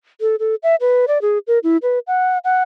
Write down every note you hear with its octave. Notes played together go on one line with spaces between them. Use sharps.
A4
A4
E5
B4
D5
G#4
A#4
E4
B4
F#5
F#5